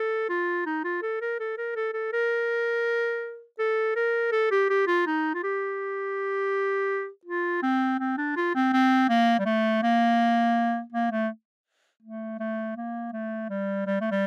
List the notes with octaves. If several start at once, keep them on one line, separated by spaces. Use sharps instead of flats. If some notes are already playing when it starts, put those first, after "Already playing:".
Already playing: A4
F4
D#4
F4
A4
A#4
A4
A#4
A4
A4
A#4
A4
A#4
A4
G4
G4
F4
D#4
F4
G4
F4
C4
C4
D4
F4
C4
C4
A#3
G3
A3
A#3
A#3
A3
A3
A3
A#3
A3
G3
G3
A3
G3